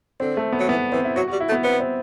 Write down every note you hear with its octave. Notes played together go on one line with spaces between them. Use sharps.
D3 C4
A3
B3
F#3
E3 B3
E3 C4
E4
F#3 F#4
F#4
G3
E4
A3
B3
B3 C4
C4